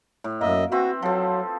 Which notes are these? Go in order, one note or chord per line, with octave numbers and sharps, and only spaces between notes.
A2
F#2 A#3 D#5 E5
C4 F#4 B4 E5
F3 F#3 A4